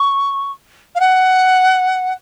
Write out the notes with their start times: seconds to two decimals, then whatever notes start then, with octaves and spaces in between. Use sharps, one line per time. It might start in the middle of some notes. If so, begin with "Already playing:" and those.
Already playing: C#6
0.95 F5
1.00 F#5